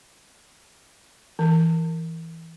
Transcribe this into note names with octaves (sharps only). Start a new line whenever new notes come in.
E3